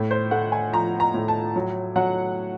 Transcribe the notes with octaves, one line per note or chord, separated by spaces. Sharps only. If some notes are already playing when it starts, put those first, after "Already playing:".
Already playing: A2
C5
A3 F#5
G#5
F3 A#5
A#5
A2
A5
F#3
F#3 F#5